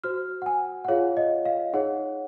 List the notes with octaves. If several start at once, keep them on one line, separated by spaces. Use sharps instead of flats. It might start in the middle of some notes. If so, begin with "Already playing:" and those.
F#4 C5 F6
F#5
G#5
F#5
F4 G#4 C#5 F5
D#5
F5
D#4 G#4 C#5 F#5